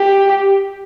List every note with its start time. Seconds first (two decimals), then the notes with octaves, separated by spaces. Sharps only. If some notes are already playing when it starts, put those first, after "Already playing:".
Already playing: G4